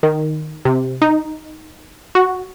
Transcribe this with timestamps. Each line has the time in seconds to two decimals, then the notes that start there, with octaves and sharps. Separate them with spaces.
0.03 D#3
0.65 C3
1.02 D#4
2.15 F#4